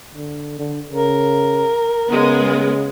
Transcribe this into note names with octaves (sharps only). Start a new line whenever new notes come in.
D3
D3
C#3 A#4
C#3 G#3 B3